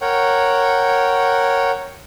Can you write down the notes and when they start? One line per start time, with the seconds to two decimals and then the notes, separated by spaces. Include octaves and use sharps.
0.01 A#4 C#5 F#5 G5